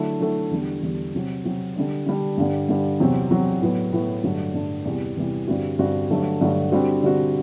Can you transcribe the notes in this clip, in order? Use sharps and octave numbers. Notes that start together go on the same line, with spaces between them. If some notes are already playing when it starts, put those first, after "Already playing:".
Already playing: D3 F#3 A3 E4
D3 F#3 A3 E4
E2 D3 G3
E2 D3 G3
C3 F#3 C4
C3 F#3 C4
D3 G3 D4
D3 G3 D4
G2 D3 G3
G2 D3 G3
E2 C3 F#3 C4
E2 C3 F#3 C4
A2 F#3 B3
A2 F#3 B3
G2 D3 F#3 A3 D4
G2 D3 F#3 A3 D4
E2 C3 E3 G3
E2 C3 E3 G3
G2 D3 G3 C4 F#4
G2 D3 G3 C4 F#4
G2 D3 F#3 A3
G2 D3 F#3 A3
D3 G3 C4 F#4
D3 G3 C4 F#4